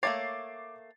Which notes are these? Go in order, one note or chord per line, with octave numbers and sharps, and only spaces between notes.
A3 A#3 C#5 D6 A6 C7